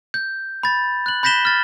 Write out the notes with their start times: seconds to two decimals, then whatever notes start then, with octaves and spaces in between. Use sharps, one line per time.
0.14 G6
0.63 B5 A6
1.06 F#6 F#7
1.23 B5 G6 A#6 B6 E7 G7
1.45 F6 A6